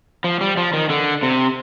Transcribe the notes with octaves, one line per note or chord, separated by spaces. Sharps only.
F3
G3
F3
D#3
D3
C3